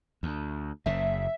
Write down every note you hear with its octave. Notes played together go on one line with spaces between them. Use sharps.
D2
F#1 C#3 E5